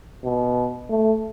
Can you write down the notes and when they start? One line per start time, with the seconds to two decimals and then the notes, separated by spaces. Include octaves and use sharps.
0.25 B2
0.89 A3